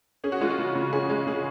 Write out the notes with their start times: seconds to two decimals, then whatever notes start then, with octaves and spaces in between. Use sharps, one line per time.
0.24 C#4 G#4
0.32 F#4
0.41 G#3 F4
0.50 F#4
0.58 C#3
0.75 C#3
0.93 C#4 G#4
1.10 G#3
1.27 C#3 G#4